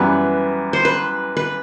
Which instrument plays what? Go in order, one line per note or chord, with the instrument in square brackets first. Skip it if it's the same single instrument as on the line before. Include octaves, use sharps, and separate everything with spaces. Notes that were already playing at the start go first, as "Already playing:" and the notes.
Already playing: [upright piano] F#2 E3 G3 B3 [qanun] B4
[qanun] C5
B4
B4